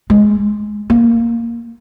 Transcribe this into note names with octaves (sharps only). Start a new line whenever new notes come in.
G#3
A#3